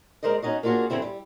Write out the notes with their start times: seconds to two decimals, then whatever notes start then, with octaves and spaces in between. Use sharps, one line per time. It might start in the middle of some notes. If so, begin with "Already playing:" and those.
0.23 G#3 A#4 C5 D5 D#5
0.42 C#4 D#4 F#4 D#5
0.63 A#3 D4 F4 F#4 G#4
0.90 G2 B2 D3 E3 C4 E4
1.02 G3